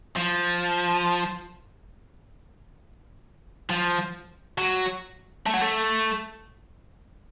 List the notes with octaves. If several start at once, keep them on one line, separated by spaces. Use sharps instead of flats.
F3
F3
F#3
A3
F#3
A3